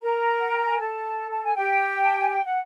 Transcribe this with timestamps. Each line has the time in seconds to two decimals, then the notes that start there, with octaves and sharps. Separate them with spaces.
0.02 A#4 A#5
0.40 F#5
0.53 G5
0.66 G#5
0.79 A4 A5
1.31 A5
1.44 G#5
1.56 G4 G5
2.03 A5
2.17 G#5
2.31 G5
2.45 F#5